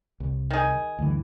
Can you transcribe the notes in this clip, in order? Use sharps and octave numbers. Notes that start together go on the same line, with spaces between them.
C2
D#3 G#4
D2 G2 E3